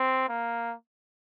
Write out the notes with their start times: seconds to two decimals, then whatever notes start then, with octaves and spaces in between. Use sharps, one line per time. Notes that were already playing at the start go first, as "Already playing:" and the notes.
Already playing: C4
0.29 A#3